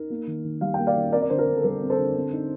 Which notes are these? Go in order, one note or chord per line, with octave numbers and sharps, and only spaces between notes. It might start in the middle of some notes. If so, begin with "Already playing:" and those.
Already playing: D#4 A#4
A#3
D#3
D#3
G3 F5
A#3 G5
D5 F5
D#3
C4 A#4 D5
D5
D3 C5
A#4
D3
A4
G3 A#4
C4
A4 C5
D3
C4
D#4